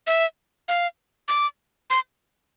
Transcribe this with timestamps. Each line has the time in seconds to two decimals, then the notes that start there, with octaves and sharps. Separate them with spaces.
0.07 E5
0.68 F5
1.28 D6
1.90 C6